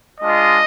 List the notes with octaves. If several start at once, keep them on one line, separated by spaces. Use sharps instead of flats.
G#3 D4 F4 D#5